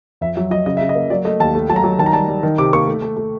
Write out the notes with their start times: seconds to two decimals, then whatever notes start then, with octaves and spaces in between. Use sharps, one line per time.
0.21 F2 E5
0.36 F#3 E5
0.51 F#3 D#5
0.66 C#3 D#5
0.77 C#3 E5
0.89 D#5
0.95 A#3
1.10 F#3 D5
1.25 A3 D#5
1.40 D#2 A5
1.55 A3
1.69 F#3 A5
1.76 A#5
1.84 F#3
1.99 D#3 A5
2.06 A#5
2.13 G3 A5
2.28 G3
2.43 D#3
2.58 C3 D6
2.73 A#3 C#6
2.88 A3
3.02 A3
3.17 A3